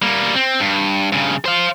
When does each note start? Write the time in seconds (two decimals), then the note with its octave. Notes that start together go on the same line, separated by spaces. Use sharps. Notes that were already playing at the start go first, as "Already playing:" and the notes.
0.02 G3 A#3
0.35 C4
0.60 G2
1.12 G2 C#3
1.45 C5 F5